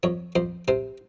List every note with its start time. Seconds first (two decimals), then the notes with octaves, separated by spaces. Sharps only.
0.03 F2 C#5
0.35 F2 C5
0.68 C3 C5